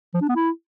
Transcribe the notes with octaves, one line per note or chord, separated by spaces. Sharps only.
F3
D4
B3
E4